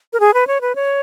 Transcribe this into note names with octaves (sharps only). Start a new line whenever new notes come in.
A#4
G#4
B4
C#5
B4
C#5